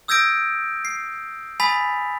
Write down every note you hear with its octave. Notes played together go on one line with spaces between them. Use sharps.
D#6 E6 G6 G#6 A#6 D7
C7
G#5 B5 D#6 A6 B6 F7